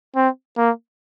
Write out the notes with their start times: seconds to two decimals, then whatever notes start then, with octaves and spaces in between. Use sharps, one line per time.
0.16 C4
0.58 A#3